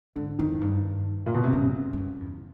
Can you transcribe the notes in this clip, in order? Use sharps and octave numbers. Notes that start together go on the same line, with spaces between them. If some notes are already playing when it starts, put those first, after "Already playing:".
G#2 D3
F2 D#3
G2
A#2
B2
C3
G2 C#3
G2
F#2
E2